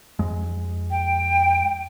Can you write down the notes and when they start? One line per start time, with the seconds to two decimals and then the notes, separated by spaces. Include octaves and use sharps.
0.19 F2 G#3
0.91 G5